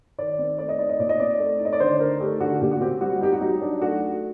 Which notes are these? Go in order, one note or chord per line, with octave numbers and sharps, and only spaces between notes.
D#3 D5
C4
A3 D5
D#5
D#4 D5
D#5
A#2 D5
D#5
C4 D5
A3
D#4
D#5
D5
D3 C5
D#4 A#4
A3 G4
D3 F#4
A#2 G4
F#4
C4 G4
G3 F#4
D#4 G4
F#4
F#3 D#4
D4
A3 F#4